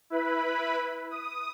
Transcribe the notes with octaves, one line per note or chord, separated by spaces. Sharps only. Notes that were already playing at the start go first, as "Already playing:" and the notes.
E4 B4 B5
D#6